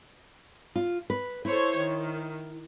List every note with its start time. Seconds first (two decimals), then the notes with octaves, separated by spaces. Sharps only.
0.76 F4
1.10 B4
1.45 E4 A4 C5 C#5
1.77 D#3